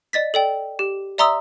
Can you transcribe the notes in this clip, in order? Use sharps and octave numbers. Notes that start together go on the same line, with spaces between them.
D5 D#5 A6 B6
A4 D5 G5
G4
D5 E5 A#5 C6 D#6 E6